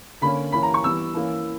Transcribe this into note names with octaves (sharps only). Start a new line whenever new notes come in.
D3 A#3 C#4 B5
E3 A#3 C#4 B5
A#5
C#6
E3 G3 B3 E6
E3 A#3 C#4